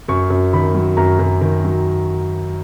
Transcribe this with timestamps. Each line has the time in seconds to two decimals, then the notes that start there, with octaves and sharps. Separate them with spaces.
0.09 F#2 C#6
0.30 F#2
0.53 D#3 B5
0.75 F#3
0.97 F#2 A#5
1.19 F#2
1.41 D#3
1.64 F#3